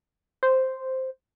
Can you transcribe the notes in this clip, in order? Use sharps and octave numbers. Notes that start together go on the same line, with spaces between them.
C5